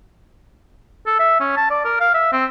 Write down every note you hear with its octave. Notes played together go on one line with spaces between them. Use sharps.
A4
E5
C#4
A5
D5
A#4
F5
E5
C4